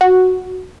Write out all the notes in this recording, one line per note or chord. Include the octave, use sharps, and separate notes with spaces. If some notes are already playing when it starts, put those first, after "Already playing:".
F#4